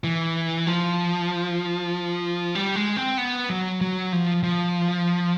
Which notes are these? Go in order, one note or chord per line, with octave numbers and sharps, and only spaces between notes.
E3
F3
G3
G#3
C4
B3
F#3
F#3
F3
F3